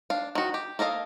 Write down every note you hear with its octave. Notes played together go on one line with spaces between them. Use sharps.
D4 F5
D#3 F#4
G4
A#3 A4 D#5 F5